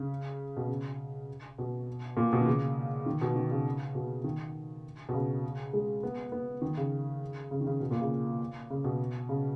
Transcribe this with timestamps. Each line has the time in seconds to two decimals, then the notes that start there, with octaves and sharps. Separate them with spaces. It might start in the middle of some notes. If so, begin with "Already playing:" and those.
Already playing: C#3
0.57 B2
0.68 C#3
1.58 B2
2.17 A#2
2.33 B2
2.41 D#3
2.46 C#3
3.06 D#3
3.21 B2
3.36 D#3
3.51 C#3
3.95 B2
4.24 D#3
5.09 B2
5.14 C#3
5.73 G#3
6.03 B3
6.32 B3
6.62 D#3
6.77 C#3
7.51 C#3
7.60 D#3
7.66 C#3
7.80 B2
7.91 A#2
8.01 C#3
8.70 C#3
8.84 B2
9.29 C#3